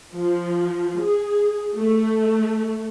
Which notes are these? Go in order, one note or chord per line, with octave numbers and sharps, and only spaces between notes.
F3
G#4
A3